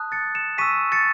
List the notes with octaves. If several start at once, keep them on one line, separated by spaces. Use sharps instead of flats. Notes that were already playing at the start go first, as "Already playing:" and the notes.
Already playing: A5 D#6 F#6
A6 C#7
C#7 E7
G#5 C#6 E6 B6 D#7
A6 C#7